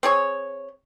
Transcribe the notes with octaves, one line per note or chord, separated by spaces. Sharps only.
C4 G#4 C#5